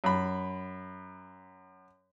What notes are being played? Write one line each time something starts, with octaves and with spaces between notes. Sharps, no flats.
F#2 B5